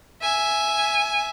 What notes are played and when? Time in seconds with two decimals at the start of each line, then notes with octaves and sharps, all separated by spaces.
0.22 E5 G#5